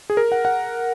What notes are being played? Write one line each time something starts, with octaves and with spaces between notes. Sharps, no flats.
G#4
A#4
F#5
F#5